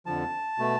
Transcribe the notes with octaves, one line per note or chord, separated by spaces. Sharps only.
F2 D3 F3 A5
B2 A3